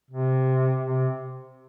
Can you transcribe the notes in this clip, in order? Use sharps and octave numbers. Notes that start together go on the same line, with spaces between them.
C3
C3